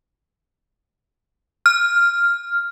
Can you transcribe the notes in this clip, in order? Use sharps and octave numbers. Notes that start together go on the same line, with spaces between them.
F6